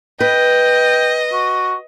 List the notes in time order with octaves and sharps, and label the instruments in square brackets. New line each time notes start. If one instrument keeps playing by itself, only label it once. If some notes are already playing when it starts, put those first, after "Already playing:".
[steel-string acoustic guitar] B4 [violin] D#5 [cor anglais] G5
[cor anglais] F#4